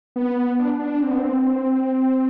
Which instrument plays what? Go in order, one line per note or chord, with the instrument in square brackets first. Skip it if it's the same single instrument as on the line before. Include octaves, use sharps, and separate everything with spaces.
[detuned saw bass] B3
D4
D4
C4
B3
C4